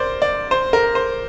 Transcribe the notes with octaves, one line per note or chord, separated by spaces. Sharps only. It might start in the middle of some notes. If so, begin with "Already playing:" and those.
Already playing: A#4 C5 D5
D5
C5
A#4
C5